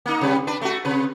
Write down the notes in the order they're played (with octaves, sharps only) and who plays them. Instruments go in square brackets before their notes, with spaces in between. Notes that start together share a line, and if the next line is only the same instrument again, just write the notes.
[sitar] A#3 D#4
C3 G3 B4
D4 B4
A3 F#4
C3 B4